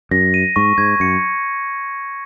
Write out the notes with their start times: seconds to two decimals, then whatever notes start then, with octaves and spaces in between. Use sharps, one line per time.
0.11 F#2 A#6
0.34 D#7
0.56 G#2 C#6
0.78 G#2 G#6
1.00 F#2 C#7